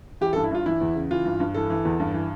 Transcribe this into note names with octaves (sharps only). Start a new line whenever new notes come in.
E3 G4
A4
G2
E4
G2 F4
E3 E4
E2
C#3
E3 F4
G2
G2
E3 A4
E3
E2
G2
E3